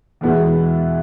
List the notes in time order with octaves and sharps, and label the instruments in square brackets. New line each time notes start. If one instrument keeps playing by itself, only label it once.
[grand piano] E2 B2 G#3 B3 E4